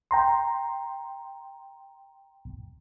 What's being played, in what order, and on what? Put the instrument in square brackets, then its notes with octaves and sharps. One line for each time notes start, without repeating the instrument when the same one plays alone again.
[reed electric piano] G5 A#5 C6